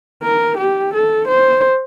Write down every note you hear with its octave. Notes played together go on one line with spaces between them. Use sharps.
A#4
G4
A4
C5